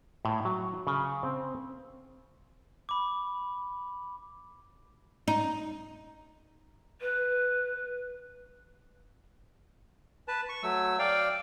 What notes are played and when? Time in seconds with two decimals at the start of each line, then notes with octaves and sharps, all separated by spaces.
0.25 A2
0.45 F#3
0.87 C#3
1.23 C4
2.89 B5 D6
5.28 D#4
7.01 B4
10.28 B4 A5
10.49 C#6
10.63 F#3 A3 E6
10.99 D5 F5 G5